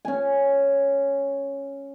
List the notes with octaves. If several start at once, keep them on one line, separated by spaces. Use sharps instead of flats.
C#4 G#5